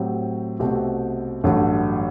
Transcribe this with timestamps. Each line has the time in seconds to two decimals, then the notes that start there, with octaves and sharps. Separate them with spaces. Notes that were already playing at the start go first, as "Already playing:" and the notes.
Already playing: A2 F#3 C4 G4
0.59 C2 B2 A3 C4 G4
1.44 A1 G2 D3 F#3 A3